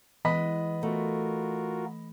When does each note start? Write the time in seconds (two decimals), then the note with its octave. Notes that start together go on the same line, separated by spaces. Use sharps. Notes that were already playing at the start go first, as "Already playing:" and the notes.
0.25 E3 G#3 B3 D#5 B5 B6
0.83 A3 F4 F#4 A#4